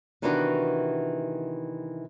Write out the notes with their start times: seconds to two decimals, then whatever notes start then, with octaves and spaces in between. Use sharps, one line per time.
0.22 C3 D#3 E3 B3 D4 F#4